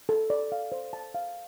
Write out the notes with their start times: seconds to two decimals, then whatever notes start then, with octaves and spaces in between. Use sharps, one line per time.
0.09 A4
0.30 D5
0.52 F5
0.72 C5
0.93 A5
1.15 F5